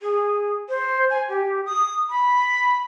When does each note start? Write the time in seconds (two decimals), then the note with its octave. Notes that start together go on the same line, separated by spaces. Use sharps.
0.01 G#4
0.69 C5
1.10 G#5
1.29 G4
1.65 D#6
2.10 B5